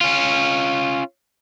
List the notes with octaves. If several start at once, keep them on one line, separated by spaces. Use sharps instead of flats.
C#4 F4